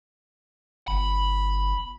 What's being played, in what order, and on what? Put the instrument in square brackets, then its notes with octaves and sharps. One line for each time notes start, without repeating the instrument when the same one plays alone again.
[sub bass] G1 [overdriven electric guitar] B5